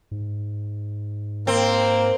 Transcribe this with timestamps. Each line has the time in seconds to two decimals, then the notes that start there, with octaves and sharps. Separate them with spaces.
0.11 G#2
1.47 A#3 C4